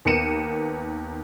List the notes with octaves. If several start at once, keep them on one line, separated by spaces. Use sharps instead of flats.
D#2 B3 A#4 C#7 D#7 E7